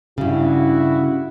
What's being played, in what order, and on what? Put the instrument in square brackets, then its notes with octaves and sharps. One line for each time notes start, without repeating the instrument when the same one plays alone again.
[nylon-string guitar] G2 C#3 [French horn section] E4 F#4